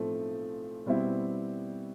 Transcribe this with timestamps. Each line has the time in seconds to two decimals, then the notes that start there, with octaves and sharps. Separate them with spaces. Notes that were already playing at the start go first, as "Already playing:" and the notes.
Already playing: B1 A2 F3 A3 C4
0.86 B2 G3 C4 E4